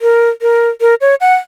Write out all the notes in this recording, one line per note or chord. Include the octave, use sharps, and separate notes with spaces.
A#4
A#4
A#4
C#5
F#5